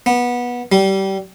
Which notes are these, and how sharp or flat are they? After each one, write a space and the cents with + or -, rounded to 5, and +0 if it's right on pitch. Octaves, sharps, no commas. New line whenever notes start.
B3 -20
G3 -20